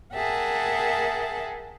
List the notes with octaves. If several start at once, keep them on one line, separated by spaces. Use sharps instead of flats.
G#4 A#4 E5 F#5 G5 A5